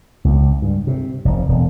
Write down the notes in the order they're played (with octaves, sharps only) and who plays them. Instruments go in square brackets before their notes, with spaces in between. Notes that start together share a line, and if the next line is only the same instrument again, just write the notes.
[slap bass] C#2
G2
C3
F1
E1